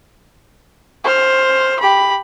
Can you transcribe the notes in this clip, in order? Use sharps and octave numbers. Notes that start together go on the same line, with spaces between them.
C5 F6
G4 B5